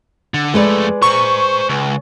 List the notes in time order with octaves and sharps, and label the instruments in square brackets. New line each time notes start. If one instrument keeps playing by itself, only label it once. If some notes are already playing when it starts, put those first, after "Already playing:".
[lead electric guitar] D3
[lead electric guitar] F2 A3 [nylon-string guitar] G#3 B4 D5
[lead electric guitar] C5 A#5 [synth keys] C#6
[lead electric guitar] C#2